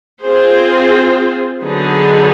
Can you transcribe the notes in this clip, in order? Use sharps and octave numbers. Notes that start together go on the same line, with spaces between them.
C4 F4 G#4 C5
D3 F#3 B3 D#4 G#4